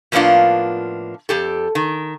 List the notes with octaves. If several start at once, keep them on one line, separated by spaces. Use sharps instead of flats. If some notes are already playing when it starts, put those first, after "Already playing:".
A2 F3 A#3 B3 D4 F4
F2 G4 A4
D#3